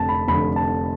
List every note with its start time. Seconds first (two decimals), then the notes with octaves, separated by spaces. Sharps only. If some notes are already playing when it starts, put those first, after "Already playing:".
Already playing: F1 F2 D3 A5
0.09 B5
0.28 F1 F2 D3 B5
0.56 A5